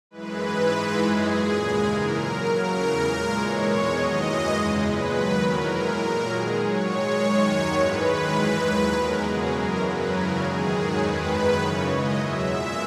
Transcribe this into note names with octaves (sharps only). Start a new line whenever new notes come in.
F#2 E3 G#3 B4
G#2 E3 G#3
G#2 E3 G#3
F#2 E3 G#3 G#4
A#2 F#3
D#2 C#3 G#3
G#2 E3 G#3 A#4
A#2 F#3 A#4
D#2 C#3 F#3 A#4
E2 C#3 E3 A#4
A#2 G#3
G#2 E3 G#3 C#5
E2 B2 G#3
D#2 D#3 F#3 D#5
F#2 E3 G#3
E2 C#3 G#3
A#2 G#3 B4
D#2 D#3 F#3
E2 B2 F#3 A#4
F#2 E3 G#3 A#4
A#2 F#3 A#4
D#2 D#3 G#3 G#4
A#2 F#3 C#5
G#2 D#3 G#3
F#2 D#3 G#3 C#5
D#2 D#3 F#3
G#2 E3 G#3 B4
F#2 D#3 G#3
G#2 E3 G#3
D#2 D#3 F#3
E2 B2 G#3 A#4
E2 C#3 F#3 G#4
F#2 E3 G#3 A#4
E2 C#3 F#3 B4
E2 C#3 F#3 A#4
F#2 D#3 G#3 G#4
G#2 D#3 F#3 G#4
E2 D#3 G#3 B4
F#2 D#3 F#3
F#2 C#3 E3 C#5
D#2 C#3 G#3 D#5
E2 B2 F#3 E5
A#2 G#3